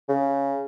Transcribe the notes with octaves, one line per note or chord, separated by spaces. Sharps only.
C#3